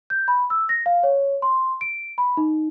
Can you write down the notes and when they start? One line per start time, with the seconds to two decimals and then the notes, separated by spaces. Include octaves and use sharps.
0.10 G6
0.28 B5
0.50 E6
0.69 A#6
0.86 F5
1.03 C#5
1.42 C6
1.81 D7
2.18 B5
2.37 D#4